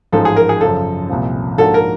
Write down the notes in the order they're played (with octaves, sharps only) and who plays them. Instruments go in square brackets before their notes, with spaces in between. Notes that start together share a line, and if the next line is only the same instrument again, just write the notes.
[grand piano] A1 G#2 F3 G#3 [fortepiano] A4
[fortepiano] G#4
A#4
G#4
[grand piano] F#2 C#3 F3 [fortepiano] A4
[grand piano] C2 A#2 F3
[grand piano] G#2 F3 A#3 D4 F#4 [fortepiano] A4
[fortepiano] A#4